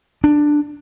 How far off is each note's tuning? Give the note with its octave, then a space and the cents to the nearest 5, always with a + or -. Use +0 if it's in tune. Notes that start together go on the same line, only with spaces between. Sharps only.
D4 +10